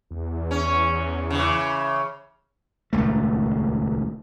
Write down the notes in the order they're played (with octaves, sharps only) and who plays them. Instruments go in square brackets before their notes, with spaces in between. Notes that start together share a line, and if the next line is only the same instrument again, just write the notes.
[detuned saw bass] E2
[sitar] C#4
C#3 E3
[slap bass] D#1 C#2 A3